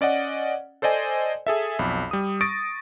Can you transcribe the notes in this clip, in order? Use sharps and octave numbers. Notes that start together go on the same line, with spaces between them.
C#4 D5 D#5 F#5
A4 C5 D5 D#5 G#5
G#4 A4 E5
B1 F2 B5
G3 D#6
C#6 D#6 A6 A#6 D7